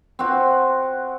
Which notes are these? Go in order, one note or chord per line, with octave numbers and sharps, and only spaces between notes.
C4 F#4